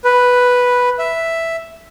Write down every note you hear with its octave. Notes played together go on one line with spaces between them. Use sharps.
B4
E5